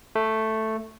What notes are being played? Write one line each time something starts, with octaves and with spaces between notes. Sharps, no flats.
A3